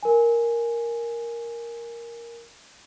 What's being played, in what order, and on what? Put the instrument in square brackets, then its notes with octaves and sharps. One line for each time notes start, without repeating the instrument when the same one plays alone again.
[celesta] A#4 G#5